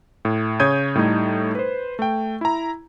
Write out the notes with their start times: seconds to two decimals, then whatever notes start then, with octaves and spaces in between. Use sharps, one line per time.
0.25 A2
0.60 C#3 C#5 D#6 G6 G#6 D#7
0.95 A2 G3 A3 D#4
1.55 B4 C5
1.99 A3 G5
2.41 E4 A#5